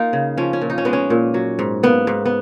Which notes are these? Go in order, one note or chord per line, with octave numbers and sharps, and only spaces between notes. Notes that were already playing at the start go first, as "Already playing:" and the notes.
Already playing: A#3 D#4 F4
C#3
F3 C#4
C#4
A#2
D#4
C#4
G#3 B3
C#4
A#2
F#3
G#2
A#3 B3
G#2
B3